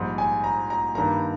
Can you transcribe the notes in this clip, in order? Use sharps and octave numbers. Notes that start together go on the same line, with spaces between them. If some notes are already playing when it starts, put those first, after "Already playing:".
Already playing: A#1 G#2 G3
G#5
A#5
A#5
G2 D#3 G3 A#3 A#5